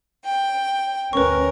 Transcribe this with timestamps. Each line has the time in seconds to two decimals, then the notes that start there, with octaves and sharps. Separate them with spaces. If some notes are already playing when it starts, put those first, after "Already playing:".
0.25 G5
1.13 D2 C#4 A#4 B4 C#6